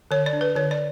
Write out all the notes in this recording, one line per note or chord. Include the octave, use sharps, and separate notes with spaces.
D3 C#5
D5
D4
B4
D3 C#5
D5